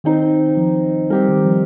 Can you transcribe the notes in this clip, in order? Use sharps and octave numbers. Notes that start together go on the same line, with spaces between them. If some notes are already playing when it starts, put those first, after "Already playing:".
D#3 C4 D#4 C5
F3
G3 C4 G4 A#4
D#3
F3